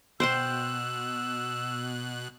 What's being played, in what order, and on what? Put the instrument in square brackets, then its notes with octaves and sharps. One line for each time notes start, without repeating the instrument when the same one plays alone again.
[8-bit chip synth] B2 F#6 [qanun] C5 G5 C6 [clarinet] E6